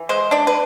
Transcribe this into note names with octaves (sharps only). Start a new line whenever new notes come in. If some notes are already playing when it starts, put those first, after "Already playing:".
Already playing: E3
G#3 C5
D4 D5
B4